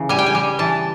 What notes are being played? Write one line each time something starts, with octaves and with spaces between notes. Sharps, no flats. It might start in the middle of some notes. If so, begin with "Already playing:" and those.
Already playing: C#3 E3
G3 G#5
G5
G#5
G3
E3 A5